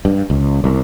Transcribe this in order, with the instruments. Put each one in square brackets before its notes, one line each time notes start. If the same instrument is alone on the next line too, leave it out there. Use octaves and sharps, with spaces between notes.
[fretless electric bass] G2
C#2
C2